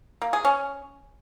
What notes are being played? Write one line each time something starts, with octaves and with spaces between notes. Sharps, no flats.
A#3
G#4
C#4